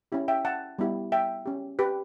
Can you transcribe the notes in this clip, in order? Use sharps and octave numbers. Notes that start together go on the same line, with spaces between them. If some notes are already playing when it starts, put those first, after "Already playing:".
C#4 E4 G4
E5 G5
F#5 A5
G3 B3 E4 G4
E5 G5
C#4 G4
G4 B4